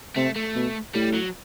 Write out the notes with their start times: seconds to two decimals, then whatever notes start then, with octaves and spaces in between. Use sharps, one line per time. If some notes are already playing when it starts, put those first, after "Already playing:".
0.16 C3 A3
0.36 A3
0.55 B2
0.95 A2 G3
1.14 F#3